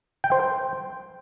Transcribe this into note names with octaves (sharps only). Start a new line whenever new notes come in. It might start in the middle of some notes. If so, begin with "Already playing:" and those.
G5
C5
G5